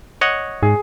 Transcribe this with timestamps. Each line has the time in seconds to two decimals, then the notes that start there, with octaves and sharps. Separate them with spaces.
0.21 C#5 D#5 F#5
0.63 G#2 G#4